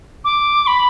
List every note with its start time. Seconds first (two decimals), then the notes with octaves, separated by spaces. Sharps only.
0.24 D6
0.67 B5